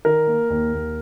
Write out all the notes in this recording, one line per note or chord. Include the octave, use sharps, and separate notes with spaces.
D#3 A#4
A#3
D#2
D#2